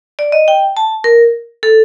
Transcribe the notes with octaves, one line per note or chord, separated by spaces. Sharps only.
D5
D#5
G5
A5
A#4
A4